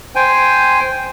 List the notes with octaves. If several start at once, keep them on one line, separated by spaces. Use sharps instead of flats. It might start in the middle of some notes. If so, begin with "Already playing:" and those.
C5 G5 G#5